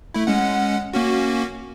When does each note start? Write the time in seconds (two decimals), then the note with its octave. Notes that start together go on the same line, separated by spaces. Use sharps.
0.14 A3 E4
0.27 G#3 C#4 F#5
0.93 A#3 C#4 F#4